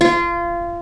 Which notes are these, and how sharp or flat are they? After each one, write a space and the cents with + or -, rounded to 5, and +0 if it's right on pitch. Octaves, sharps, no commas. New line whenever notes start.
F4 -25